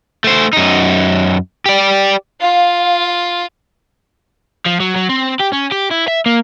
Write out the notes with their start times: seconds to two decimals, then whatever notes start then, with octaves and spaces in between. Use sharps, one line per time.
0.24 A3 C5
0.53 F#2 D#4
1.66 G4 D5
2.41 F4 F5
4.66 F3
4.80 F#3
4.96 F#3
5.09 C4
5.40 G4
5.52 C#4
5.71 G4
5.91 E4
6.08 E5
6.26 A#3